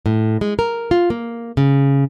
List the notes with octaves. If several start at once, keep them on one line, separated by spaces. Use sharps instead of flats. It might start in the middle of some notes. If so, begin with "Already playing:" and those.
A2
G#3
A#4
F4
A#3
C#3